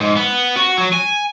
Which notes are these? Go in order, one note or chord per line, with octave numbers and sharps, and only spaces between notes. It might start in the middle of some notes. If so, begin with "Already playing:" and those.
G#2
B3
F#4
F#3
G#5